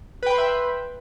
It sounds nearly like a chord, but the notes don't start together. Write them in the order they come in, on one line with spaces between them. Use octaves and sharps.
B4 G5 B5 C6 E5